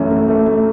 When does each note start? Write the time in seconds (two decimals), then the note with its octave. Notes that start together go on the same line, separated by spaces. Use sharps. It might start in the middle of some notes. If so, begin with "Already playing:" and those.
Already playing: F#2 E3 A3 C#4
0.11 A3
0.28 A3
0.47 A3